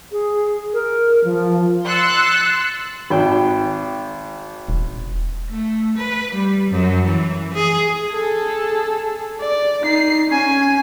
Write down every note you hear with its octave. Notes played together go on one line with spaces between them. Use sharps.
G#4
A#4
F3
C6 E6 F#6 A6 C#7
G#1 G5
E1
A3
B4
G3
F#2
E3
G#4
G#4 A4
D5
D#4 C7
C#4 G#5